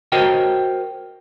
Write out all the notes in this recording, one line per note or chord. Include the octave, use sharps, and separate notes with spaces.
F#4 A#4 C5 C#5 D#5 G5